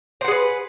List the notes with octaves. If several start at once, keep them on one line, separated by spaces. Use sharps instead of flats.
G#4 B4 C5 F#5